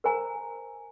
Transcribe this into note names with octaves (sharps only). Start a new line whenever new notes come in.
A#4 C5 G#5 A#5